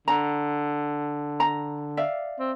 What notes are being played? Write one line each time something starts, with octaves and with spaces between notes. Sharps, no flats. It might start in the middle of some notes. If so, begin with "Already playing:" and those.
D3 A#5
A#5
D5 E5 F5
C4